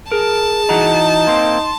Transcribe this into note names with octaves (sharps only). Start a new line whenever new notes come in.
G#4 A#4 A5
E3 D#4 F#4 A#5
A#3 C4 C6